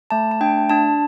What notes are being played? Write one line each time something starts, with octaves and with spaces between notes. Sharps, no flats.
A3 A5
A5
D4 G5
D4 A5